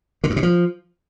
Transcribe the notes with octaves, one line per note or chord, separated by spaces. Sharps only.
D3
G2
B2
F3